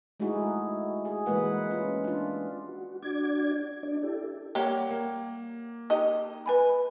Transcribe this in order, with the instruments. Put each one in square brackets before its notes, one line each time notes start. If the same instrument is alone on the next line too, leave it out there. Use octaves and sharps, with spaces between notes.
[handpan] G#3 A3 D#4 E4 F#4 G#4
G#4
E3 G#3 A#3 B4 F#5
C#4 F4
D4 F4
[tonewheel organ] F#4
D4 F#4 D5 G#6
D4 D5
E4 G4 A4
[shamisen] G3 G4 [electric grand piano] A#3 C#5 F#5
[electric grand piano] A#3
[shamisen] D#4 G4 D#5
[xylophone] B4 G#5 B5